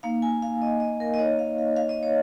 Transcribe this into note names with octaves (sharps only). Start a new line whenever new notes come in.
A#3 D#4 F5
G#5
F5
D#5
D#5
A#4
D#5
A#3 D#4 C#5
F5
F5
F5
D#5
C#5